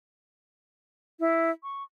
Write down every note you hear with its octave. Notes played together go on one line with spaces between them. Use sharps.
E4
C#6